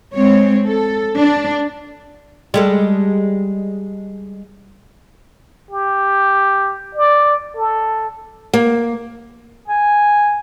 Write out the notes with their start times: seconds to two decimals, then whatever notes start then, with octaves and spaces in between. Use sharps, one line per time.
0.14 G#3 C4 C#5
0.66 A4
1.17 D4
2.54 G3 G#3 A4
5.71 G4
6.95 D5
7.57 A4
8.54 A#3
9.68 G#5